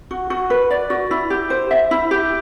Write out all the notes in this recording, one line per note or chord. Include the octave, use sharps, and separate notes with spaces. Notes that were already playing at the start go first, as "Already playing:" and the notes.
F#4
F#4
B4
D5
F#4
E4
G4
C5
E5
E4
G4